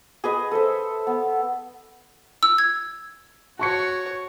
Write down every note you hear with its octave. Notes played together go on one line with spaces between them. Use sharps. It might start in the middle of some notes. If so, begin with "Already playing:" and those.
G#4 B4 D#5
A4 C5 E5
B3
E6
G#6
F#4 C#5 A5 C#6 C#7